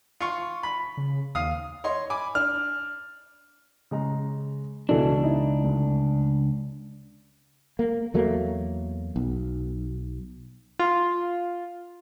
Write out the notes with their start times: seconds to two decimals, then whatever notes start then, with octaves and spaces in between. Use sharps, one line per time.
0.20 F4 C#6
0.63 B5
0.97 C#3
1.35 D#2 F5 D#6
1.84 C#5 D#5 C6
2.10 G#5 B5 D6
2.35 D4 F6
3.91 C#3 G#3 A#5
4.89 C#2 B2 E3 D4 A4
5.23 D#4 E4
5.64 D2
7.79 A#3
8.14 E2 F#3 A3 A#3
9.16 B1
10.79 F4